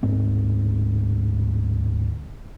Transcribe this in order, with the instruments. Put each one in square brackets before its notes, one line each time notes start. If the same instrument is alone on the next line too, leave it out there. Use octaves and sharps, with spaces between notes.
[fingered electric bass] D1 G#2 C4